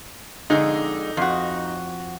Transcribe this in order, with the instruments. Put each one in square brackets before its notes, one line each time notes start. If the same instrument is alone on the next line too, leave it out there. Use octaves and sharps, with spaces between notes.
[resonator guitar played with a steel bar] F2 D3 G#3 [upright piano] D#4
[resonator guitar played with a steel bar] F2 F#4